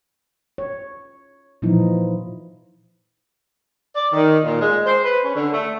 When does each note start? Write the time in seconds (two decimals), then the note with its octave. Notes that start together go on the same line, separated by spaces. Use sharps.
0.58 C#5
1.62 A#2 E3 F3 D#4 E4
3.95 D5
4.13 D#3
4.44 A#2
4.60 G#3
4.85 C5
5.03 B4
5.24 C#4
5.35 D3
5.52 A3